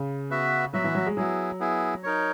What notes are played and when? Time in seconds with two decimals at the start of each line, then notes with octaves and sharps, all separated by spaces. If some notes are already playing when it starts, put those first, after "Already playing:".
Already playing: C#3
0.31 B3 F#4 B4 E5
0.73 F#3 B3 F#4 B4 E5
0.84 E3
0.95 F#3
1.06 G#3
1.17 F#3 B3 E4 G#4
1.60 B3 E4 G#4
2.03 D#4 A#4 C#5